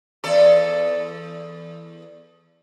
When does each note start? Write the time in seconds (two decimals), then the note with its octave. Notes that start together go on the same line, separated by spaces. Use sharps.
0.24 E2 A4 D5